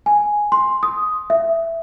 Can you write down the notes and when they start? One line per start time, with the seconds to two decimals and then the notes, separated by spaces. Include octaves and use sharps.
0.06 G#5
0.52 C6
0.83 D#6
1.30 E5